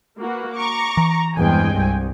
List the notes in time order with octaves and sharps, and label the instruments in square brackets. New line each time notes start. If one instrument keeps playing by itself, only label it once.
[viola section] A#3 F#4 B4
[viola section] A#5 [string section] C#6 D6
[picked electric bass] E3
[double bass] E2 G#3 [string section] G2 [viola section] C4 G5 G#5
[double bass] C2